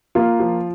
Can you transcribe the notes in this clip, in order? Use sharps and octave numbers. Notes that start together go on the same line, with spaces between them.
A#3 F4
F3